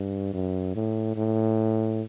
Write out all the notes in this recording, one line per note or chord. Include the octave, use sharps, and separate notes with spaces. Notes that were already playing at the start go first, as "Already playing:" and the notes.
Already playing: G2
F#2
A2
A2